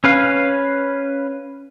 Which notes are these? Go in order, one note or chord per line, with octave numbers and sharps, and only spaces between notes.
C#4 B4 F5